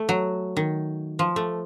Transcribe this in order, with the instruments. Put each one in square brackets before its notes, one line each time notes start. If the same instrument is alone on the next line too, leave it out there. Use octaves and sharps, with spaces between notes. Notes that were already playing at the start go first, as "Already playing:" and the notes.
Already playing: [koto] A3
F#3
D#3
F3
A3